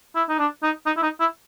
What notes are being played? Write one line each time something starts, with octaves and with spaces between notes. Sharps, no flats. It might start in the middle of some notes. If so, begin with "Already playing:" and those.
E4
D#4
D4
D#4
D#4
E4
D#4
E4